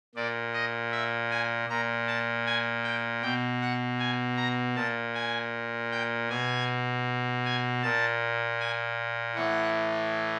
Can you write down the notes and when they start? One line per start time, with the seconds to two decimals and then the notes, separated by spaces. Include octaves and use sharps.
0.15 A#2 D5
0.54 D#5
0.92 E5
1.30 G#5
1.69 A#2 A#5
2.07 A5
2.46 G#5
2.84 G5
3.22 B2 G5
3.61 F#5
3.99 G#5
4.37 A#5
4.75 A#2 A5
5.14 G#5
5.91 G5
6.29 B2 G#5
7.45 G#5
7.83 A#2 A5
8.60 G#5
9.35 A2 E3 F#5